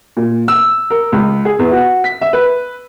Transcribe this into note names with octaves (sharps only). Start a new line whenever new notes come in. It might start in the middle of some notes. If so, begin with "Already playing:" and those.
A#2
E6
A#4
C#2
G#4
E2
F#4
B6
E5
B4